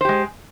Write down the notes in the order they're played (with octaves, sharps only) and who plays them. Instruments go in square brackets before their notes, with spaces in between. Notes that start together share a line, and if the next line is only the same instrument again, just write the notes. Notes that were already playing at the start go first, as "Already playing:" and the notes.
[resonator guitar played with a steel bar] C5
G4
G#3